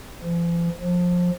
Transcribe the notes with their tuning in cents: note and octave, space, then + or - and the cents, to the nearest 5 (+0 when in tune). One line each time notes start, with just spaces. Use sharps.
F3 -45
F3 +25